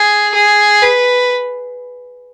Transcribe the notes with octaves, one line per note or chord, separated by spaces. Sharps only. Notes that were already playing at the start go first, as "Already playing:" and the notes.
Already playing: G#4
G#4
B4